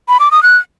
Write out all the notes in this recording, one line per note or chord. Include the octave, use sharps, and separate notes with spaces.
B5
D6
D#6
F#6